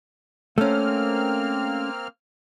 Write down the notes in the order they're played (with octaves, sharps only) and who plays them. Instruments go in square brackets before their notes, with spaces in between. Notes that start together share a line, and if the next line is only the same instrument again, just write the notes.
[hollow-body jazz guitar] A3 C#4 [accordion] A#3 C4 F6